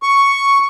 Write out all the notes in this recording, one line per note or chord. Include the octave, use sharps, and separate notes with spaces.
C#6